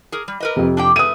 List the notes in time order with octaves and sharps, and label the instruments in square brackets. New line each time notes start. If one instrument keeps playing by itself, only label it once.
[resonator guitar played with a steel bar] G#4 A#4
G3
A#4 B4 D#5
[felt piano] F2 C3
[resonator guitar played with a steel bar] D4 G4 G5
[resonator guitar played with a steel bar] A3 B4 [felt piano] D#6 D#7